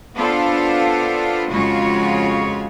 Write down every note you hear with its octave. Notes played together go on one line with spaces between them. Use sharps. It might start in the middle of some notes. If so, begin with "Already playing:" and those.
B3 D4 F4 A4 C5 F5
F2 C#3 G#3 F4 F#4 C#5